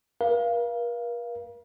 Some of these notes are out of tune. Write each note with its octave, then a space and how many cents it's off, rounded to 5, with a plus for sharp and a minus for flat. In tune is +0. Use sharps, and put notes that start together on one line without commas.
A#4 +45 F5 -20